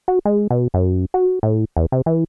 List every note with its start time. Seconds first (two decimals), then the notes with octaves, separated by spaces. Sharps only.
0.08 F#4
0.25 G#3
0.50 B2
0.74 F#2
1.14 F#4
1.43 A2
1.77 E2
1.92 C3
2.06 E3